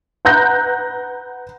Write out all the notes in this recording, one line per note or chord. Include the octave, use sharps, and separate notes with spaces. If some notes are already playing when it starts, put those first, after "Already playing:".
B4 F#5 A#5 F#6 G6 A#6